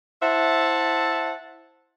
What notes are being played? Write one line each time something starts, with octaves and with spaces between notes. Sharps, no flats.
E4 C5 E5 F#5 A5